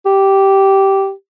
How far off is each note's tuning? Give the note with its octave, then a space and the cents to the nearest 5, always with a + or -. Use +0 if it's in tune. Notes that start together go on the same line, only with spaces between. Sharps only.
G4 -10